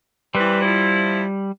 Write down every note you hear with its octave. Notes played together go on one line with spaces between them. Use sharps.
E3 G3 C4 B4
F3 E4